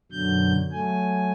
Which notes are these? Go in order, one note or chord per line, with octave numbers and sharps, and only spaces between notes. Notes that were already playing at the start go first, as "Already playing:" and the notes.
F#2 B2 D3 F#3 G6
F#3 A3 G#5